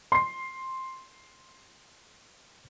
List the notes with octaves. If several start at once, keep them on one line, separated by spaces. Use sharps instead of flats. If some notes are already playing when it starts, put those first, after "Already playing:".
C6 C7